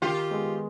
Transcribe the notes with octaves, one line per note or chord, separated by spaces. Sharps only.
D#3 F4 G4
G#3 B3